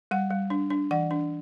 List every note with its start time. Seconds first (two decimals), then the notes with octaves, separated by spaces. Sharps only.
0.11 G3 F#5
0.30 G3
0.50 D4
0.70 D4
0.91 E3 F#5
1.11 D4